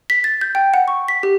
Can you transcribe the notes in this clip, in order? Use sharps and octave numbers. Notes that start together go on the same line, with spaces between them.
B6
A6
G6
G5
F#5
C#6
B6
G4